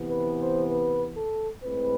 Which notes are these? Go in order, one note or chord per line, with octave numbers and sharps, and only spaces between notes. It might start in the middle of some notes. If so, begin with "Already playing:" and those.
Already playing: C3 E3 B3
B4
C5
B4
A4
A2 G#3 C4 B4